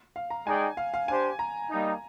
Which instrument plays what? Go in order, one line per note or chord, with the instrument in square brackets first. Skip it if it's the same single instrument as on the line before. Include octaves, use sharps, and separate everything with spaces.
[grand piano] F5
A#5
[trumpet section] G#3 D#4 G#4 D5 G5 [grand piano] G#5
[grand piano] F5
F5
[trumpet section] D4 G4 C5 [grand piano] G#5
[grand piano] A#5
[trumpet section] G3 A#3 D#4